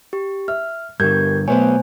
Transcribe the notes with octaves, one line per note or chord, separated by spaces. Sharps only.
G4
E5 F6
G2 D3 G4 A#4 G6 G#6
B2 F#3 A3 B3 C5 C#5 G#5